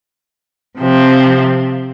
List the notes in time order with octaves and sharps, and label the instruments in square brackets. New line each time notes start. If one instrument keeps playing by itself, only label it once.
[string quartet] C3 F3 C4